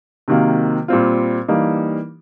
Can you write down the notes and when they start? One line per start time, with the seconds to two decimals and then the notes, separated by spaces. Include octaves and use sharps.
0.28 C3 D#3 F#3 A#3
0.88 A#2 G3 C4 F4
1.48 E3 G3 A#3 D#4